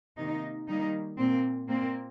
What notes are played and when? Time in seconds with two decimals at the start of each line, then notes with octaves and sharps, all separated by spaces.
0.17 C3 D#3 A#3 D#4
0.68 D#3 G3 A#3 D#4
1.18 A#2 A#3 C4
1.68 A#2 A#3 C4